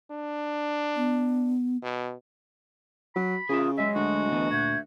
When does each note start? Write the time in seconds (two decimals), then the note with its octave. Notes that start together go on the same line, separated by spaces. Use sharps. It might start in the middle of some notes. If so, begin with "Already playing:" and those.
0.11 D4
0.96 B3
1.82 B2
3.15 F#3 B5
3.49 C#3 F4 G#4 A#4 E5 D#6
3.78 F#3 G#3 D#5 E5 G#5
3.95 D2 F#4
4.32 E3 B3
4.52 A#2 E5 G6 G#6